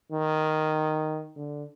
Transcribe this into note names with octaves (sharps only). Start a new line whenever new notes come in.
D#3
D3